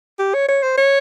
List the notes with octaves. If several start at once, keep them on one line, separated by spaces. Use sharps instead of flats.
G4
C#5
C#5
C5
C#5